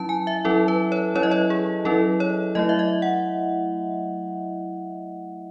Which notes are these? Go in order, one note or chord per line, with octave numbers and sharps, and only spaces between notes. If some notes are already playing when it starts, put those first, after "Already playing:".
Already playing: F#3 C#4 E4 A5
G#5
E5
F#3 C#4 E4 A4
B4
C#5
F#3 C#4 E4 C#5
D#5
C#5
G#4
F#3 C#4 E4 A4
C#5
F#3 A3 E4 D#5
E5
D#5
F#5